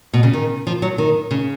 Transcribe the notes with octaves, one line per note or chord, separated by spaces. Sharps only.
B2
C#3
D#3
F3
F#3
D#3
C#3